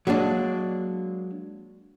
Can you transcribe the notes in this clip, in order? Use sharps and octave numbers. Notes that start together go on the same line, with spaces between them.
F#3 G#3 A#3 D4